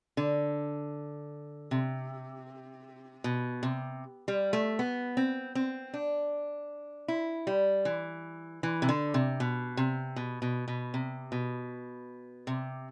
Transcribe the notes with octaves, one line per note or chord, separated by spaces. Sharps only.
D3
C3
B2
C3
G3
A3
B3
C4
C4
D4
E4
G3
E3
E3
C3
D3
C3
B2
C3
B2
B2
B2
C3
B2
C3